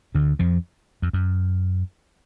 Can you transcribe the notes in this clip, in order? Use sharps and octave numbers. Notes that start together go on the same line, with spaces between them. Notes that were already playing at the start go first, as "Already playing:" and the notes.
D2 D3
F2 F3
F2
F#2